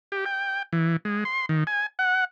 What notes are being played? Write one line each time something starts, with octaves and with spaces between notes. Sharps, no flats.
G4
G5
E3
G#3
C6
D#3
G#5
F#5